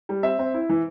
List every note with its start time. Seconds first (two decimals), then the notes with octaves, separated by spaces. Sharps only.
0.09 G3
0.23 C4 E5
0.39 C4
0.54 E4
0.69 E3